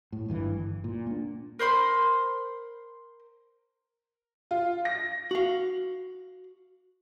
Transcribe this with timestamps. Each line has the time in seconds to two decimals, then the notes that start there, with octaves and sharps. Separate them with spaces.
0.12 A2
0.28 G#1 G2 D#3 E3
0.59 G1
0.84 A#2
1.07 A#3 D4
1.59 A#4 C5 B5 C6
4.51 F4
4.85 A#6
5.31 F#4 F5